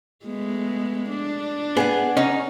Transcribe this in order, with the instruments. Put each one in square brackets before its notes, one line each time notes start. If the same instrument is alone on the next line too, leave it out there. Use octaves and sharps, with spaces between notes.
[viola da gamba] G#3 A3 B3
D4
[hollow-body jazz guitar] B3 [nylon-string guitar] G#4 F#5 G#5
[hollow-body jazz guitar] C#4 D#4